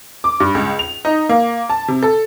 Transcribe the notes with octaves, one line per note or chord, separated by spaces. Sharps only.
D6
G2
C#2
F7
D#4
A#3
A5
C3
A4